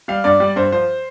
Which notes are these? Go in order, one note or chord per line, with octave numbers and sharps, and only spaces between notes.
G3 F5
G2 D5
G3
G2 C5
F3 C5